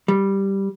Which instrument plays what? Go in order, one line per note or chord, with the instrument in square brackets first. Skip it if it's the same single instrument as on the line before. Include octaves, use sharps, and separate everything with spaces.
[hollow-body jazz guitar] G3